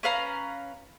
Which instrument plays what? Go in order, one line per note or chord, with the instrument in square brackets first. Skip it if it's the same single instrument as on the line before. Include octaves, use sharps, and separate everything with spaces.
[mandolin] C#4 B4 F5 A#5